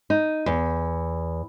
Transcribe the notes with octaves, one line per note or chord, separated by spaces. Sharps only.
D#4
E2